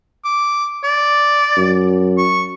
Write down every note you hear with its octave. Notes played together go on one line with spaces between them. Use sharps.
D6
D5
F#2
C#6